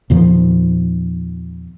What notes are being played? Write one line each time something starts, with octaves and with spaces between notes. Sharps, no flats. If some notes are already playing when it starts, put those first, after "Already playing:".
E2 A#2 D#3 F3